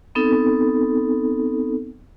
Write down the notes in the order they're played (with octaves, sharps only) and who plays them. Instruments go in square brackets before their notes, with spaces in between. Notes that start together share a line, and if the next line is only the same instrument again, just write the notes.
[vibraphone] B3 C4 D#4 A4